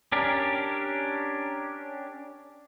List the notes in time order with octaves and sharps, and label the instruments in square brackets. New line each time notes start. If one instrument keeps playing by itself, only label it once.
[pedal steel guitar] C#4 D4 G4 A#4